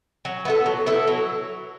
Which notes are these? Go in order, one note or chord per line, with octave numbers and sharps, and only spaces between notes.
F#3
B3 E4 A4
F#3
B3 E4 A4
F#3